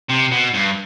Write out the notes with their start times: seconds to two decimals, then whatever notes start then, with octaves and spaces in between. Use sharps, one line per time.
0.09 C3
0.31 B2
0.54 G2